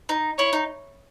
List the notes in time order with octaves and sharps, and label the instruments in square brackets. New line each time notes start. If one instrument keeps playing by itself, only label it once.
[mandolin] D#4
[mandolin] E4 [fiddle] C#5
[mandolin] D#4